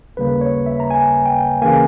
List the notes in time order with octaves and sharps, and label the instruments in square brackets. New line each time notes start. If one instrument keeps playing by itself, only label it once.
[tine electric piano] D#2 C#3 G3 A#3 B4
C#5
E5
A#5
G#5
G5
C#3 E3 A#3 G#5